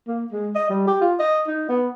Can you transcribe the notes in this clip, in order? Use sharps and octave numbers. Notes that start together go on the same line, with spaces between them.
A#3
G#3
D#5
G3
G4
F4
D#5
D#4
B3